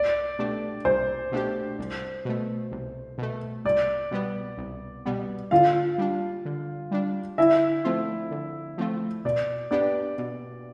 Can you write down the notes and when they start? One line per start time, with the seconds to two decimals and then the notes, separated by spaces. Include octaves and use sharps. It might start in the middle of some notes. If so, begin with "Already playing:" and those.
Already playing: C2 D5
0.39 B2 A3 D4 G4
0.85 C2 C5
1.32 B2 A3 D4 G4
1.79 C2
2.25 B2 A3
2.71 C2
3.18 B2 A3
3.65 C2 D5
4.11 B2 G3 B3
4.58 C2
5.05 B2 G3 B3
5.51 D3 F4 F5
5.98 G3 D4
6.45 D3
6.91 G3 D4
7.38 D3 E4 E5
7.84 F3 A3 C4 F4
8.31 D3
8.78 F3 A3 C4 F4
9.25 B2 D5
9.71 B3 D4 G4 D5
10.18 B2